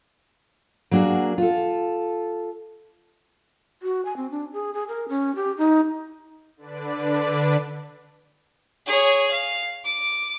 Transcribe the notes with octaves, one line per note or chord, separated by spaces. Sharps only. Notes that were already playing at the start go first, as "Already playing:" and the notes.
F#3 A#3 D4 F#4 G#4
F4 A4
F#4
G#5
C4
D4
G#4
G#4
A#4
C#4
G4
D#4
D3 D4 B4 D5
G#4 C#5
F5
D6